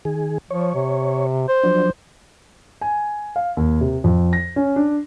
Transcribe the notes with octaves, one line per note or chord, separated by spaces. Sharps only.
D#3 G#4
F3 C#5
C3
C5
F3 F#3 D4
G#5
F5
D#2
C3
F2
A#6
C#4
D4